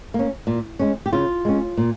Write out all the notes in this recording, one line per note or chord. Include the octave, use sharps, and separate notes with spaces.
A#3 C#4
A#2
G#3 C#4
G4
C#3 F4
G#3 C#4
A#2